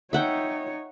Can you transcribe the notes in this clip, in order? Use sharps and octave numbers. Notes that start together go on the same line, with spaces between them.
D#4 C#5 E5 F#5 G5